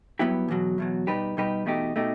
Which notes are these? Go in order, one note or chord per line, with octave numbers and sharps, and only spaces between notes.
G2 F#3 B3 E4 G4
E2 B2 F#3
E2 B2 F#3
B2 G3 D#4 G4 B4
B2 G3 D#4 G4 B4
E2 B2 A3 D#4 G4
B2 A3 D#4 G4